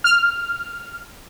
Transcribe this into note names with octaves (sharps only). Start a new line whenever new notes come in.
F6